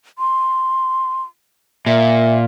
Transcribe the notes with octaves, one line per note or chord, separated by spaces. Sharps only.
C6
A#2 E5